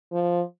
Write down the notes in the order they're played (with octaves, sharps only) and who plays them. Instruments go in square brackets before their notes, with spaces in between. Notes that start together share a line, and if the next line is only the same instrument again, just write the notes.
[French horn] F3